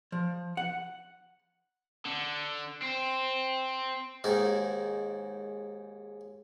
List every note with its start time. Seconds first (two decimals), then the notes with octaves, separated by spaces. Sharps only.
0.12 F3
0.57 F#5
2.06 D3
2.82 C4
4.24 D#2 G#2 D#4